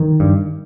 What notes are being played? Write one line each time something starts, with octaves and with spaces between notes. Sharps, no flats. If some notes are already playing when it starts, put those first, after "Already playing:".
Already playing: D#3
G2